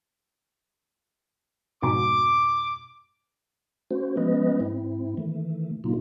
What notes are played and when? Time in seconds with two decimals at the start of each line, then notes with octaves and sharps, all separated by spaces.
1.82 F2 G#2 B2 D6
3.91 A3 C#4 F#4 C5
4.17 F3 G#3 B3 C#4 B4 D#5
4.60 G#2 C4 E4
5.17 D#3 E3 A3
5.84 A#2 C#3 F#3 A#3 D#4 F4